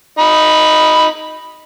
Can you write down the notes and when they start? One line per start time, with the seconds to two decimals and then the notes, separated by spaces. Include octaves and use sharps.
0.19 D#4 B5